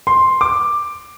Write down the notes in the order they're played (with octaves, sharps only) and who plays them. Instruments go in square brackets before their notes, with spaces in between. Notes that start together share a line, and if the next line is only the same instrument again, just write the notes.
[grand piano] C6
D6